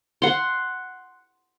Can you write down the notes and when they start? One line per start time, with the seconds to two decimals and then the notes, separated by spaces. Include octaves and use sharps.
0.22 F#5 C6